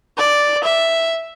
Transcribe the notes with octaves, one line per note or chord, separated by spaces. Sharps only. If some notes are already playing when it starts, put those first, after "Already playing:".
D5
E5